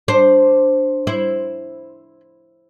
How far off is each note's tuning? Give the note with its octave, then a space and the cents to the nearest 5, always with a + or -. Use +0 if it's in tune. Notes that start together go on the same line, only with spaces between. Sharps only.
D4 +0 C5 +0
E4 +0 C5 +0